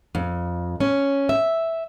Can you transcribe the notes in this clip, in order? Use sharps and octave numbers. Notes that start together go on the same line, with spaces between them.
F2
C#4
E5